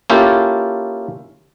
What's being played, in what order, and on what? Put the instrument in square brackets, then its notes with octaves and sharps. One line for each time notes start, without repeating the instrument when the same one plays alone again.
[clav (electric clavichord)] A#3 C#4 E4 F4 G4 A4